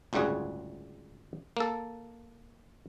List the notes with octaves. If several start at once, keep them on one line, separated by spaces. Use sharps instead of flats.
G1 C#2 A2 G3 F#4 G#4
A#3 A4